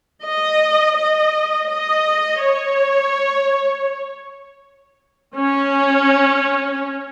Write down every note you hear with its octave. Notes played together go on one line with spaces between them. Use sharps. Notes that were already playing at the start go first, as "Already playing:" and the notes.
D#5
D#5
D#5
C#5
C#4